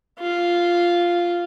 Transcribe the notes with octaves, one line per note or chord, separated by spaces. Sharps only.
F4